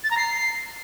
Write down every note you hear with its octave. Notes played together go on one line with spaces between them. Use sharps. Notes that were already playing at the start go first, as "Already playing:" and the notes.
A6
A#5
C7